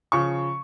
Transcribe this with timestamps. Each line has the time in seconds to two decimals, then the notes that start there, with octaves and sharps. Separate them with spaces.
0.12 C#3 F3 C#6